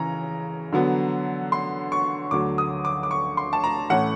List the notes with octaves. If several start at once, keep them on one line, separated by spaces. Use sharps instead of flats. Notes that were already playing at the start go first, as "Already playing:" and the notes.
Already playing: C#3 E3 A#5
D3 F#3 B3
C6
C#6
D2 D3 F#3 D6
D#6
D6
D6
C#6
C6
A5
A#5
A2 E3 A3 C#4 F#5